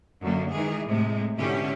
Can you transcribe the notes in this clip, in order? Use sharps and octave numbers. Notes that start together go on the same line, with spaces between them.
F#2 D3 A#3
D#3 E3 G#3 G#4
A2 C3 G#3
G#2 B2 D3 C#4 E4 G4